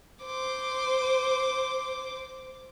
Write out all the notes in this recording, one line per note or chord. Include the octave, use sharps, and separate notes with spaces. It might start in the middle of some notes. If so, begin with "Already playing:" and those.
C5 D6